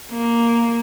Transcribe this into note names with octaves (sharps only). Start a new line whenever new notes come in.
A#3